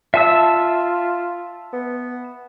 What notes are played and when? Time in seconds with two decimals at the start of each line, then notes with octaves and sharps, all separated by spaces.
0.14 F4 E5 A5 E6
1.73 B3